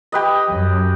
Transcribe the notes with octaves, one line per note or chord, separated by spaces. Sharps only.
G4 B4 D#5
F#2